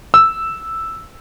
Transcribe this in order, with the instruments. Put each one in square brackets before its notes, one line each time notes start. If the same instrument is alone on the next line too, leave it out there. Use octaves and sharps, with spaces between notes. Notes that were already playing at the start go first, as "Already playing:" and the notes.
[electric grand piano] E6